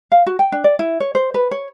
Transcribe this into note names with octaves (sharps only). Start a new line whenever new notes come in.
F5
F#4
G5
D4
D5
E4
C#5
C5
B4
C#5